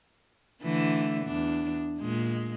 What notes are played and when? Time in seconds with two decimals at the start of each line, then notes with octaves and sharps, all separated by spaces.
0.63 D3 E3 A3
1.25 E2 D4
2.00 A#2 G#3